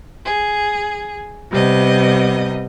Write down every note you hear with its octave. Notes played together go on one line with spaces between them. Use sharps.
G#4
C3 G3 B3 D#5